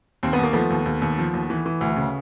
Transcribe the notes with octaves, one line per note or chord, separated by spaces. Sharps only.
D#2 C4
B3
D#2 A#3
F3 A3 B3
D#2
D#2
D#2
F3
D#2
E3
E3
D2
C#3